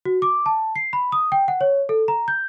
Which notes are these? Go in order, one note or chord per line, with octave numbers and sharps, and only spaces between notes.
F#4
D6
A5
C7
B5
D#6
G5
F#5
C#5
A4
A#5
G6